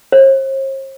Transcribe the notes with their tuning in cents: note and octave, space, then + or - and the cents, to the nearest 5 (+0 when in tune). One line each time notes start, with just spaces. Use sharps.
C5 +45